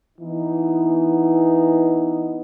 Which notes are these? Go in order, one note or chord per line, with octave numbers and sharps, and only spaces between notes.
E3 B3 D#4